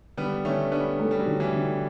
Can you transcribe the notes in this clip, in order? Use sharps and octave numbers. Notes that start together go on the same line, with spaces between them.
D3 G3 B3
D3 A3 C#4
G3 B3 D4
A3
G3
F#3
D3
E3 G3
D3